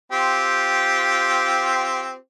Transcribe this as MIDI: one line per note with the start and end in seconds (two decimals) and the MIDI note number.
0.12 2.15 60
0.12 2.15 65
0.12 2.15 67